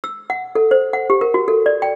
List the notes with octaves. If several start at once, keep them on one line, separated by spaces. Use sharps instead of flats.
E6
F#5
A4
C5
F#5
G4
A#4
F#4
A4
D5
G5